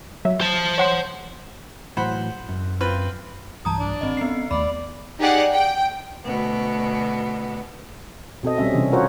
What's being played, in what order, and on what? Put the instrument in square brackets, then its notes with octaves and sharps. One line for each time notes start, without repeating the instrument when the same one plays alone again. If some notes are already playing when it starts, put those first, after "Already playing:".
[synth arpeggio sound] F#3 E5
[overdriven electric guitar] C5 A5
[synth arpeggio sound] C#5 F#5 C6
[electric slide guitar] A2 E3 F#3 [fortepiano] C5 F#5 B5
[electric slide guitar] F#2
[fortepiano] C4 F4 B4
[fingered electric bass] B1 G2 E3 [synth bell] A5 A#5 D#6
[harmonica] D4
[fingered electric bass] G#1 [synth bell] C4 D#5
[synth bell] B3 C7 [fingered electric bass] C#4
[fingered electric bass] D#2 A3 [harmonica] D5 [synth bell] B5
[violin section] D#4 G4 G#4 D5 F#5
G5
[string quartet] D2 B2 B3
[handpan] B2 C4 A4 D#5
G3 C4 C#4 E5
C3 E3 C#4 D4
F4 F#4 A#4 C5 C#5 F#5